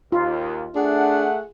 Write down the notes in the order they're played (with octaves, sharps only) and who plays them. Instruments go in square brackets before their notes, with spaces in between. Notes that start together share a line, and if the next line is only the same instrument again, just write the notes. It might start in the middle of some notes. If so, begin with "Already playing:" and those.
[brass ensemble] D#2 [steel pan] F4
[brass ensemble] A3 F#5 [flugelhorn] D4 [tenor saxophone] G#4